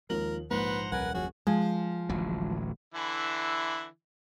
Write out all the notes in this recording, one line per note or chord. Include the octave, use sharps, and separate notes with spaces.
D#2 F3 G#3 A#4 F#7
A#1 G#2 A#3 B4 C5 F#5 A#5
D#1 C2 F3 A#4 B4 F#5 G#5
F#1 A#2 F3 C#4 F#4 G#4
F3 G#3
D1 A1 F#3
D3 E3 E4